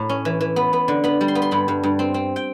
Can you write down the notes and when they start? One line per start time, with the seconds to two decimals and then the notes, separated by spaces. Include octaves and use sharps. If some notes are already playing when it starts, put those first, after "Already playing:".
Already playing: A2 A3 A#5
0.09 C#4
0.25 E3
0.41 E3
0.56 B3
0.73 B3
0.88 D3
1.04 B3 B5
1.21 G3
1.28 C6
1.35 B3
1.42 C6
1.51 G2 B5
1.68 G2
1.83 G2
1.99 C4
2.14 C4
2.36 G5